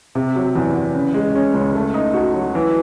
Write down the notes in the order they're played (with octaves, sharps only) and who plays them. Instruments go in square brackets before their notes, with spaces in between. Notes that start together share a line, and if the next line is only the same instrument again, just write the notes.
[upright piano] C3
F#3
E2
E2
C#3
G#3
C#4
C#2
A3
D#4
F#4
F#3
E3